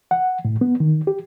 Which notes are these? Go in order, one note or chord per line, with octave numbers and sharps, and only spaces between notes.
F#5
A2
B3
D#3
G4